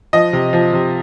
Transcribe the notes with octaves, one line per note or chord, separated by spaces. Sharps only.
F3 D#5
C3
F3
C3